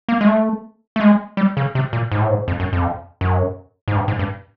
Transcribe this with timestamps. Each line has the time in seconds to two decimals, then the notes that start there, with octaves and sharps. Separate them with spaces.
0.08 A#3
0.21 G#3
0.27 A3
0.96 A3
1.01 G#3
1.37 G3
1.57 C#3
1.75 C3
1.93 A#2
2.11 G#2
2.21 A2
2.30 G#2
2.48 F2
2.60 F#2
2.73 F2
3.21 F#2
3.88 G#2
3.96 G2
4.08 G#2
4.19 G2